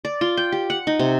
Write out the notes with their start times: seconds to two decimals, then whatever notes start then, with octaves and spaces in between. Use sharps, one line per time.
0.05 D5
0.21 F4
0.37 G5
0.52 G4
0.70 F#5
0.87 D#4
0.99 C3